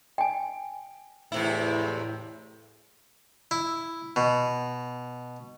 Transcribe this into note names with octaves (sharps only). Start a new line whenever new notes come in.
G5 G#5
E2 A2 C3 E4
E4
B2